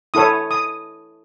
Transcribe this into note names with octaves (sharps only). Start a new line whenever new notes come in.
E4 A4 C#5 D#6
D#6